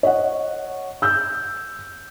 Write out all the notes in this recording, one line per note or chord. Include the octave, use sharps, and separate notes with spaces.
C#5 D#5 F#5
E6 G6